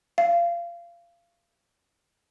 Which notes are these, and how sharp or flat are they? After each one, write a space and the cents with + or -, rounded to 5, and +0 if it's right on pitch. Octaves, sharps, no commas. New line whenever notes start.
F5 -25